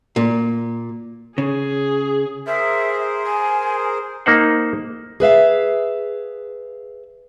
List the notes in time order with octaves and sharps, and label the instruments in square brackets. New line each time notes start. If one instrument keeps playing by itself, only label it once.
[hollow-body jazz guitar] A#2
[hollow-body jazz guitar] C#3 [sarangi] G#4
[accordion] G#4 A#4 C5 [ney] E5
[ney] G#5
[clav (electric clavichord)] A#3 D#4 C5 F#5
[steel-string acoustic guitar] G#4 B4 E5 F5